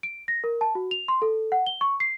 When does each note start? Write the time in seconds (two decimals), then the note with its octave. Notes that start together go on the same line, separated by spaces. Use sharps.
0.03 D7
0.28 A#6
0.44 A#4
0.61 A5
0.75 F#4
0.91 F7
1.08 C6
1.22 A4
1.52 F#5
1.66 G7
1.81 C#6
2.00 C7